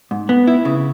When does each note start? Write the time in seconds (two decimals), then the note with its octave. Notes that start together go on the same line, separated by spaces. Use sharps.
0.11 G#2
0.29 B3
0.47 E4
0.65 C#3